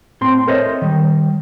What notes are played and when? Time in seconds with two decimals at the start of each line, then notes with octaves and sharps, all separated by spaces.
0.21 A2 C4 C6
0.47 A4 A#4 C5 C#5 D#5 E5
0.82 D#3 G3